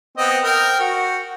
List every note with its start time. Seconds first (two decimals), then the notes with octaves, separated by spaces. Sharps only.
0.17 B3 C4 D#5
0.43 A#4 G5
0.80 F#4